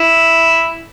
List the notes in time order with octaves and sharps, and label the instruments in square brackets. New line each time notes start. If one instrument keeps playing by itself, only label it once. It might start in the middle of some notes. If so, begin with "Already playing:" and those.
Already playing: [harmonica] E4